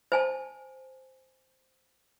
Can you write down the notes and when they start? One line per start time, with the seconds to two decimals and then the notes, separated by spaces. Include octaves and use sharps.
0.12 C5 G#5 A5